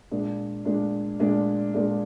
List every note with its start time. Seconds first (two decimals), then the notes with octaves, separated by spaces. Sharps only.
0.11 A#2 G#3 D4
0.65 A#2 G#3 D4
1.20 A#2 G#3 D4
1.74 A#2 G#3 D4